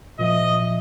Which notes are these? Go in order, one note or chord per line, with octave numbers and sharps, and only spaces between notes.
A#2 F3 D#5 E5